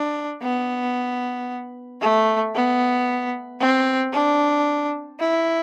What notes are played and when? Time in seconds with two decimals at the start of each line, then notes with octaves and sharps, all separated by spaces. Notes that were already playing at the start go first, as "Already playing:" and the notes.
Already playing: D4
0.43 B3
2.01 A3
2.55 B3
3.60 C4
4.13 D4
5.20 E4